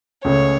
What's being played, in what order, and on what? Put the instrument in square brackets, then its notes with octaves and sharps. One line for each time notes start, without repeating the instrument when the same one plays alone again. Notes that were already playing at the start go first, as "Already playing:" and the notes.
[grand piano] C#2 C#3 A3 C#4 [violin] C#5